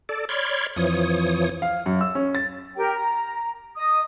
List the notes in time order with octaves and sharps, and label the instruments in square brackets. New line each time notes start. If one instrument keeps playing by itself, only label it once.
[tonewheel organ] A4 D5
C#5 D5 B5 C6 F6 G#6
F2 E3 F3 C#5 D#6
[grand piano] F5
F#2
E6
C#4
A6
[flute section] G4 A#4 G5
A#5
D#5 D#6